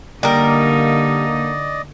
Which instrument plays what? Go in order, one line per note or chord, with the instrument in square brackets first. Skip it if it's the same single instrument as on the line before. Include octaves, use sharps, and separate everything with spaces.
[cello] D3 D#4 [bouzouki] G3 A#4 [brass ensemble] A#3 [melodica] D5 D#5